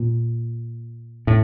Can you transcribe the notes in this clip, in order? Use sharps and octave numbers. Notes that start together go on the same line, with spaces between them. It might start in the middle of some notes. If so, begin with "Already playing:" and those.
Already playing: A#2
A2